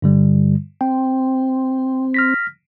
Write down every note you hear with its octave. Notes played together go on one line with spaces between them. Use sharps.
G2 D3 G3
C4 G5
F6 A#6 B6